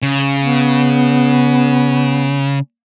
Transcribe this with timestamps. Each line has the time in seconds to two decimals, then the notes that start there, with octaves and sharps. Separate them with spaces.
0.02 C#3
0.41 B3